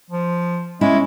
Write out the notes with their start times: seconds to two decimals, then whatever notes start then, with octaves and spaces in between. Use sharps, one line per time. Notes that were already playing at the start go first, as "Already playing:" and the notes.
0.10 F3
0.81 G#3 C#4 E4